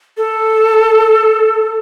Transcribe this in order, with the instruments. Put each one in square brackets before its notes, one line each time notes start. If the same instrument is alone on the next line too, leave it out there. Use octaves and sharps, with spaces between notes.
[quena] A4